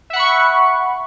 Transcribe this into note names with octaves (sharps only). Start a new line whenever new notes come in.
E5 F#5 B5 C#6